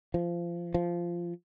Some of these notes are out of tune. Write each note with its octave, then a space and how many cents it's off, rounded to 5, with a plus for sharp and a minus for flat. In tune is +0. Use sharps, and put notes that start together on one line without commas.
F3 -20
F3 -10